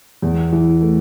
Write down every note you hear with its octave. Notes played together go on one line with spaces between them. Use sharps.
E2
E3
A3